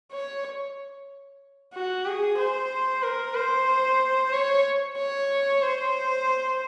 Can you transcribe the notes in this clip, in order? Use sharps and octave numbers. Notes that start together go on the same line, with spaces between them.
C#5
F#4
G#4
C5
A#4
C5
C#5
C#5
C5